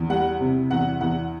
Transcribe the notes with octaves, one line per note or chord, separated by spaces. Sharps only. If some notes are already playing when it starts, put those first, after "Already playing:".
Already playing: E2
G3 F#5
C3
E2 F#5
E2 F#5